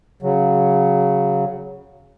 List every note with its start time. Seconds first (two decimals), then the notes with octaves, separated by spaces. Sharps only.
0.22 C#3 F#3